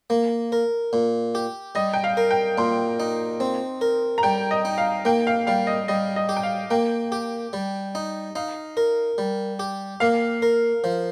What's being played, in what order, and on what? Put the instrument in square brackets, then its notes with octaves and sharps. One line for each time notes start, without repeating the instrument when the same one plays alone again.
[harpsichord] A#3
A#4
A#2
G4
[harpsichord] G3 [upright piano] D#5
[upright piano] G5
F5
[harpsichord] A#4
[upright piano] G5
[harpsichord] A#2 [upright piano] C6
[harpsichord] D#4
C4
A#4
[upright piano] A#5
[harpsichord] G3 [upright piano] G5
[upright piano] D#5
[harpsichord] D#4
[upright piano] F5
[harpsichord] A#3 [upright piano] G5
[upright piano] F5
[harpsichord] G3 [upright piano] F5
[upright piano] D#5
[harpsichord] G3 [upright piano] D#5
[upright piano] D#5
[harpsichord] G4
[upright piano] G5
F5
[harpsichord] A#3 [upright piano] G5
[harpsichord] G4
G3
D#4
[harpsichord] D#4 [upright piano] F5
[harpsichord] A#4
G3
G4
[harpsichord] A#3 [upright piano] F5
[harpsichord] A#4
F3